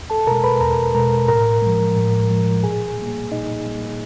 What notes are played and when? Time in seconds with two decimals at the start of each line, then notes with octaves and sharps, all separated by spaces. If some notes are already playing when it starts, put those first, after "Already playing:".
Already playing: E2
0.10 A4 A5
0.27 B2 A#4 A#5
0.31 G#3
0.44 B4 B5
0.61 E2 A#4 A#5
0.95 B2 G#3 A#4 A#5
1.28 A2 A#4 A#5
1.62 F3 G#3
1.96 A2
2.30 F3 G#3
2.63 A#2 G#4 G#5
2.98 G3 A#3
3.31 A#2 D#4 D#5
3.65 G3 A#3